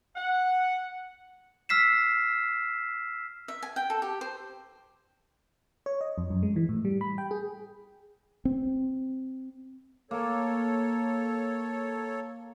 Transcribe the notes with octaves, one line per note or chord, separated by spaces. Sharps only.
F#5
E6 F6 B6 C7 E7
E5
G#5
G5
A4
G4
C5
C#5
D#5
F2
F#2
G#3
E3
A2
G3
B5
G5
G#4
C4
A#3 A4 C#5